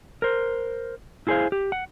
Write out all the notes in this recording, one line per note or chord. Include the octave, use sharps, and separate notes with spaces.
A#4 C5
E4 F4 G#4 B4 C5 F5
G4
F#5